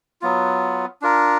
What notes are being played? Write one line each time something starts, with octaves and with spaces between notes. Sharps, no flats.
F#3 B3 F4
D4 F4 A#4